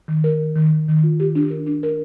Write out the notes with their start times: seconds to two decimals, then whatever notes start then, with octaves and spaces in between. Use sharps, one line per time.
0.08 D#3
0.24 A#4
0.39 D#3
0.56 D#3
0.71 D#3
0.88 D#3
1.04 F4
1.20 G4
1.35 D4
1.50 A#4
1.66 D4
1.83 A#4